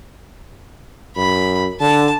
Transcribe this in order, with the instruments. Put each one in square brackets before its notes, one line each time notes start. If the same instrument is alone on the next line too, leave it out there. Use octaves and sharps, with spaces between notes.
[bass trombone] F#2 [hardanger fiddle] B5
[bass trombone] D3 [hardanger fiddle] A5